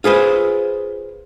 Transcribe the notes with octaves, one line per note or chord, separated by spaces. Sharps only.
F4 G#4 B4 C5